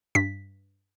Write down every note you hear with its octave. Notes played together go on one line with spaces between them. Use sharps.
G2 B6